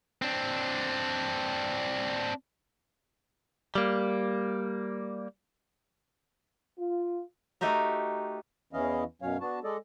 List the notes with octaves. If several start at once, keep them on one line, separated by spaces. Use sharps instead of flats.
C4 D4
G3 A#3
F4
A3 D#4 F#4 G4 A#4
E2 E3 C#4 E4 D#5 F5
F#2 B2 F#3 C#4 C#5 F5
B3 D4 F#4 A5
G#3 A4 D5 D#5